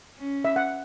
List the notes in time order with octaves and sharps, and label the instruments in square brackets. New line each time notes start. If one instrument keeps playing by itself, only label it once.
[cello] C#4
[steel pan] E5
F#5